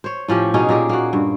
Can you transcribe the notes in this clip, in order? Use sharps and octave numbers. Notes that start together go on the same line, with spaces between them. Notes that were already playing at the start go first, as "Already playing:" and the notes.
C5 C#5
A2 F3 C#4 G4
B2 C#4 D#4 G#4
A#2 A#3 G4 G#4
A#3 F#4
G2